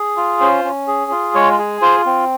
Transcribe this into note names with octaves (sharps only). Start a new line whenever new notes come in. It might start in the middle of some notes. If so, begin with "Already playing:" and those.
Already playing: G#4
F4
C#4 C5
C#4
G#4
F4
G#3 C#5
G#4
F4 C5
C4